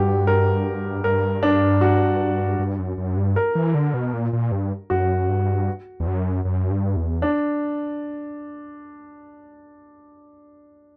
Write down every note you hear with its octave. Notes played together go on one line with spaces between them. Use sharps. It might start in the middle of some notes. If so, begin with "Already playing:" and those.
Already playing: G2 F#4 G4
A#4
G2 A#4
D4
F#4
G2
F#2
F#2
G2
A#4
E3
D3
B2
A#2
A#2
G2
F#2 F#4
G2
E2
F#2
F#2
G2
E2
D4